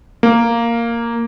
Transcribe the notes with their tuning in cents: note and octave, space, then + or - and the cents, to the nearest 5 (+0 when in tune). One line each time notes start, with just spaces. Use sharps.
A#3 -5